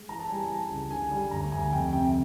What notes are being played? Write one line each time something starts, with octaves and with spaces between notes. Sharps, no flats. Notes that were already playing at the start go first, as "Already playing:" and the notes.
Already playing: G#3
E3 A#5
A5
G3 G#5
A#5
E3 A5
C#2
D3 G#5
G3
D2 A#5
D2 G#5
F2 G5
C3 G5